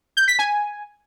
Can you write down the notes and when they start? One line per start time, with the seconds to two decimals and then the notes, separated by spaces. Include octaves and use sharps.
0.17 G6
0.28 B6
0.39 G#5